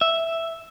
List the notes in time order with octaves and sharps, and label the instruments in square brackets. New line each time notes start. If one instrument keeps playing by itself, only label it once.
[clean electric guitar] E5